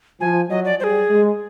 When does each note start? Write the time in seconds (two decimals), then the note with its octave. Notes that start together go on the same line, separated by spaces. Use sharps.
0.21 F3 G#5
0.50 F#3 D#5
0.65 D5
0.80 G3 G#4 C5
1.09 G#3